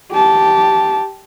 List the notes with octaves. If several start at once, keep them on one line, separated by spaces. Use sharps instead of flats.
G4 A5